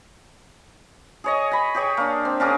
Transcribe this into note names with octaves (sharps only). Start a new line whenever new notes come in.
G#4 C#5 D#5
G#5 B5
G4 G#4 C#5
A#3 D4
C4
C#4 D4 G#4 A#4